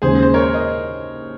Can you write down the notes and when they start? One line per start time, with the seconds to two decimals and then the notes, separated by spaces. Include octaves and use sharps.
0.02 D#2 C#3 G#3 C#4 G#4 C5
0.22 C5
0.34 A#4 C#5
0.54 D#5